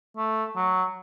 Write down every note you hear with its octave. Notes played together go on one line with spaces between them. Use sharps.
A3
F#3